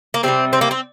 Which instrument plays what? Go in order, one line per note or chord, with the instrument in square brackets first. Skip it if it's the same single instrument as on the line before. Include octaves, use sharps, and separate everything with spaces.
[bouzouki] A#3
C3 D#3 G3 C4
C4
A#3
C4